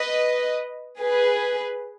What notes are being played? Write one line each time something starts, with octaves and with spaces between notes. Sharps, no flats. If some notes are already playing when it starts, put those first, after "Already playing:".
Already playing: B4 D#5
G#4 B4